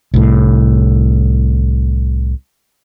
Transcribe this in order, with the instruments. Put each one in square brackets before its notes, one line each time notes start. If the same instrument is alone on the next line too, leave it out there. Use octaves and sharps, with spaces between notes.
[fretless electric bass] C2 A2